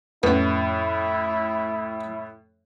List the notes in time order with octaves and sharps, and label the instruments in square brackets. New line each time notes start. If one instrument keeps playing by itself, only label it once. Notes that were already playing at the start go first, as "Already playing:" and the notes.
[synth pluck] F2 C#4 [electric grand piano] A2 [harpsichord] B3 [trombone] E4